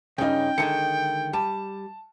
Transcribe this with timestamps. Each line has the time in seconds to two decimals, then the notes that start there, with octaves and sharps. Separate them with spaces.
0.18 G2 C#3 C#4 D#4 G5
0.58 D3 D#3 G#3 C#7
1.33 G3 A5